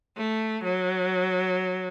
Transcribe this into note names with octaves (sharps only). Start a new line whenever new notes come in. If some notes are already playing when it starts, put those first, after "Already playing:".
A3
F#3